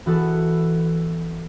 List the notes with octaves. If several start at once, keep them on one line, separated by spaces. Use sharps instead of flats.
E3 B3 F#4 A4